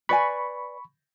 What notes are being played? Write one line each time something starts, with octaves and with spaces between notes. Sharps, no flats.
B4 D5 G#5 B5 C#6